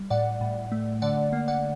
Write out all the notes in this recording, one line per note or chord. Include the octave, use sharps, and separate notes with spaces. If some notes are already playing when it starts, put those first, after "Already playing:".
Already playing: G3
A2 D5 F#5
A2
A3
D3 D5 F#5
A#3
D5 F#5